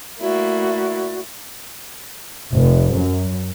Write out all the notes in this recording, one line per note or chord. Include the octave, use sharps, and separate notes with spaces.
A3 A#3 E4 F#4 D5
F1
F#2